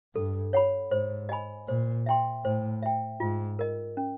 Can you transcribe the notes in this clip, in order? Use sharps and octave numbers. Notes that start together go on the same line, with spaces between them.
G2 A4
C#5 F#5 B5
G#2 C5
D#5 G#5 B5
A#2 C5
E5 G5 C6
A2 C5
E5 G5
G#2 F4
A#4 D#5
C#4